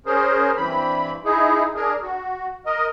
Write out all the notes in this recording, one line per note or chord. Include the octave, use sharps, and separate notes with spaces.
C#4 G#4 A#4 C5
G2 E3 C4 B5
D#4 E4 G#4
D4 G#4 A#4
F#4
A#4 D#5